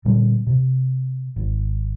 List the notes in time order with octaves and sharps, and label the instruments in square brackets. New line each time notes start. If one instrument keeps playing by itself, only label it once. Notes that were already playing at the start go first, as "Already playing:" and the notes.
[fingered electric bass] A#2 D3 G3 C4
C3
G#1